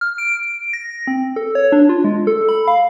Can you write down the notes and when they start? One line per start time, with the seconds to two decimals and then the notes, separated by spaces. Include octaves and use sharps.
0.01 F6
0.18 D7
0.73 A#6
1.07 C4
1.36 A4
1.55 C#5
1.72 D4
1.89 F4
2.04 G#3
2.27 A4
2.49 B5
2.68 F5